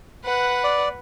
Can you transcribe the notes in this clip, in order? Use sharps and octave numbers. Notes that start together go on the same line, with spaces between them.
B4 F#5
D5